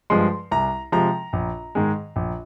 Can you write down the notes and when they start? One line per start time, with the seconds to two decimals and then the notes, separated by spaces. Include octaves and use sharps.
0.10 G2 F3 G#3 C6
0.51 C2 A#5
0.92 C3 F3 G#3 A#5
1.33 A#1
1.75 G#2 D#3 G#3
2.16 A#1